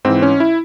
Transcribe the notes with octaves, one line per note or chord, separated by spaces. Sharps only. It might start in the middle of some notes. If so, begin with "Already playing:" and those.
G#2 E3 C4
C#4
E4